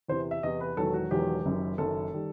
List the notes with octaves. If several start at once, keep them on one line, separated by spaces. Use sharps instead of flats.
E2 C3 E3 C5
E5
E2 C3 E3 D#5
B4
E1 E2 D#3 F#3 A4
F#4
E1 E2 D#3 F#3 G4
F#1 F#2 D#3
F#1 F#2 D#3 A4
D#3 G3